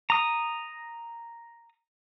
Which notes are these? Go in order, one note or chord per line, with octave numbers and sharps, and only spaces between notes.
A#5 D#6